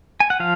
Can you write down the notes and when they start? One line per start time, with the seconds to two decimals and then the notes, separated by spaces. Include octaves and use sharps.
0.20 G#5
0.30 F#5
0.40 F3 F5